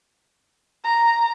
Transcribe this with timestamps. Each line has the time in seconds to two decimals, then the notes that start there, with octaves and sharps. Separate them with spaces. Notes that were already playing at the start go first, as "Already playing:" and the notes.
0.84 A#5